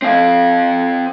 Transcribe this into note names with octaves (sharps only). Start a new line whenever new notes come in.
C4 F5